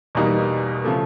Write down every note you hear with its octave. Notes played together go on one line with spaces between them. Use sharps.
E2 B2 G3 A#3 D#4
C#3 F3 A3